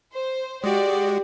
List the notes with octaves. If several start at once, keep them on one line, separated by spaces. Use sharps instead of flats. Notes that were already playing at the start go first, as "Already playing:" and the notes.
C5
G#3 F#4 G4 D5